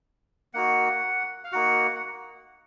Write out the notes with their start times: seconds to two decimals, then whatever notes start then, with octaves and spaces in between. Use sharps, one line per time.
0.54 A#3 D#4 F#4 F#5
1.44 F5
1.52 A#3 D#4 F#4 F#5
1.96 F#5